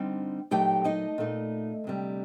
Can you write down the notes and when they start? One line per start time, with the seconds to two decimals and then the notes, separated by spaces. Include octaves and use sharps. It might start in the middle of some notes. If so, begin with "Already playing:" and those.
Already playing: D3 G3 C4 D#4
0.51 A#2 F#3 A3 D#4 G4 G5
0.84 D#4 D#5
1.18 A#2 A3 D#4
1.84 D2 C3 G3